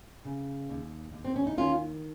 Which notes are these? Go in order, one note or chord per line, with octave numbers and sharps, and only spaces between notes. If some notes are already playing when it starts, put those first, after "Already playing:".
C#3
D#2
D#2
C4
C#4
D#4
D#3 C#4 F4